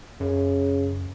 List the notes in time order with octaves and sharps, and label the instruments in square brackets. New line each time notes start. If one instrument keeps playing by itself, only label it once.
[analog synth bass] F#2 [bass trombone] C#3